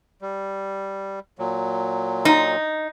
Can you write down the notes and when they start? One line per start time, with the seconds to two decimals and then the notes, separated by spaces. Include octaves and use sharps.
0.22 G3
1.39 A#2 F#3
2.25 D#4